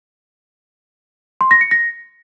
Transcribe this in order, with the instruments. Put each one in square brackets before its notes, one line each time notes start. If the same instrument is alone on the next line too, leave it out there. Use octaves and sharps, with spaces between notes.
[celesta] C6
A#6
C#7
A#6